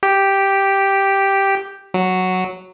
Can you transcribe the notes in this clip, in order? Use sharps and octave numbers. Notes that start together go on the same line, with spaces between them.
G4
F#3